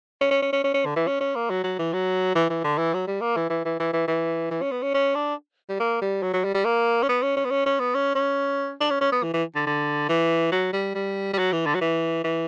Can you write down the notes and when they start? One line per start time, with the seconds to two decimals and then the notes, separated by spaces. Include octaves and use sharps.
0.21 C#4
0.31 C#4
0.42 C#4
0.53 C#4
0.64 C#4
0.74 C#4
0.85 D3
0.96 E3
1.07 C#4
1.21 C#4
1.36 A#3
1.50 F#3
1.64 F#3
1.79 E3
1.93 F#3
2.35 E3
2.50 E3
2.64 D3
2.78 E3
2.94 F#3
3.07 G3
3.21 A#3
3.36 E3
3.50 E3
3.65 E3
3.79 E3
3.93 E3
4.08 E3
4.51 E3
4.62 C#4
4.71 B3
4.82 C#4
4.94 C#4
5.15 D4
5.69 G3
5.80 A#3
6.01 G3
6.23 F#3
6.34 F#3
6.44 G3
6.54 G3
6.65 A#3
7.03 C#4
7.09 B3
7.23 C#4
7.37 C#4
7.45 B3
7.51 C#4
7.66 C#4
7.80 B3
7.95 C#4
8.15 C#4
8.81 D4
8.90 C#4
9.01 C#4
9.12 B3
9.23 E3
9.34 E3
9.55 D3
9.67 D3
10.09 E3
10.52 F#3
10.73 G3
10.95 G3
11.34 G3
11.38 F#3
11.53 E3
11.66 D3
11.74 F#3
11.81 E3
12.24 E3